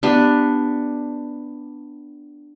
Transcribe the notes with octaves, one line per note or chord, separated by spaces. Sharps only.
B3 D4 G4